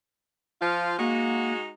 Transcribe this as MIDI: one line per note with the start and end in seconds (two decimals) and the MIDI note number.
0.62 0.95 53
0.62 0.95 65
0.99 1.70 56
0.99 1.52 58
0.99 1.70 63
0.99 1.70 66